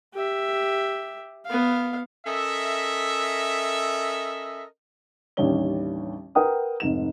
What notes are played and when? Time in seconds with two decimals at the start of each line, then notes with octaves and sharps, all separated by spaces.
0.14 G4 E5
1.46 B3 F5
2.27 C#4 A4 A#4 D#5 E5
5.37 A1 D#2 D3 G3 C#5 G7
6.35 A#4 B4 F#5 G5 D#6
6.80 F1 G#2 E7